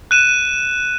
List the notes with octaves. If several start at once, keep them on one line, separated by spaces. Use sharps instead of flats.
F#6 D#7 E7